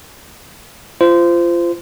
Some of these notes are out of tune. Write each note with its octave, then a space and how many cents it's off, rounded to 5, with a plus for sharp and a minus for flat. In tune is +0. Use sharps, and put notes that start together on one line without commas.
F4 -25 C5 -20